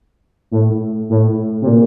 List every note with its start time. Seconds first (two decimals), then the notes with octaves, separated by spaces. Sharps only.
0.51 A2
1.10 A2
1.62 C3
1.67 A#2